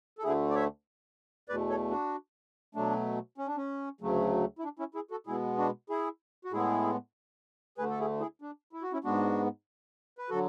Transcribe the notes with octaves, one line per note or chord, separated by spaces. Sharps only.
A4
D2 D3 A3 E4 G#4
D5
C#5 E5
E2 B2 A3 B4 D5
A4 C#5
D4 F#4
B2 F#3 A3 D4
C#4
D4
C#4
D2 C#3 F#3 A3
E4
D4
C#4 E4
E4 G#4
F#4 A4
B2 G#3 B3 E4 G#4
D4 F#4
E4 G#4
F#4
A2 G#3 B3 E4 G#4
D2 D3 A3 G#4 B4
A4
E4 G#4
E4 G#4
D4
E4
F#4
C#4 E4
G#2 G#3 B3 D4 F#4
B4
D3 F#3 F#4 A4